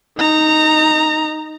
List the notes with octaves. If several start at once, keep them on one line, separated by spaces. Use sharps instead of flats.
D#4 A#5